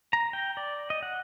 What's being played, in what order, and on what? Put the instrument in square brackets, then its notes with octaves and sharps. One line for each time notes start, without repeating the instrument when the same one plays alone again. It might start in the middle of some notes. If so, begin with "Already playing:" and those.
[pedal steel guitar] A#5
G5
D5
D#5
F#5